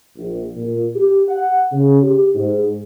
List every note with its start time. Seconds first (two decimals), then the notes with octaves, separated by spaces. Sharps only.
0.17 A#1
0.56 A#2
0.96 G4
1.28 F#5
1.72 C#3
2.02 G4
2.34 G#2